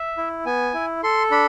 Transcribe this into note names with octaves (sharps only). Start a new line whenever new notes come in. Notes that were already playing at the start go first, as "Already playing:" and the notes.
Already playing: E5
E4
B3 G#5
E4
A4 C6
D4 B5